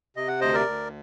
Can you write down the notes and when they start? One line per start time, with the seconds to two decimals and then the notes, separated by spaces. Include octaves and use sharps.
0.16 C3 D#5
0.28 F#5
0.41 D2 C5 D#5
0.54 A#4 D5
0.67 D2